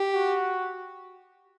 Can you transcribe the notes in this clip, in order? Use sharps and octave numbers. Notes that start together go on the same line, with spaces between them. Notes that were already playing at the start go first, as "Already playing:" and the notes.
Already playing: G4
F#4